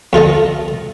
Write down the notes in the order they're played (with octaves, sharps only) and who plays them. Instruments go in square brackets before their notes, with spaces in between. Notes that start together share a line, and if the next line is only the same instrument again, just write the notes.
[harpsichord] F2 F4 A4 D#5